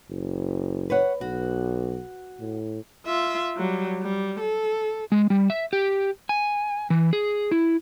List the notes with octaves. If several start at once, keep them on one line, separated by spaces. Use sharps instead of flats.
F#1
B4 C#5 F#5
B1 F#4
A2
F4 E5
F#3 G3
G3
A4
G#3
G3
E5
G4
G#5
E3
G#4
E4